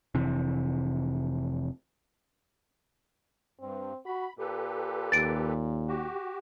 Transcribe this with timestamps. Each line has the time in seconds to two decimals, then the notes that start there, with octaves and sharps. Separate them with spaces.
0.15 F1 C3 E3
3.60 G2 C4
4.06 F#4 B5
4.39 A#2 G4 A4 B4
5.12 D#2 A6 D7
5.88 F#4 G4